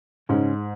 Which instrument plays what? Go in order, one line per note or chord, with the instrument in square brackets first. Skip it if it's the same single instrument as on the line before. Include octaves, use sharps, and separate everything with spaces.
[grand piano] G#2 [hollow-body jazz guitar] C#3 G#3 C#4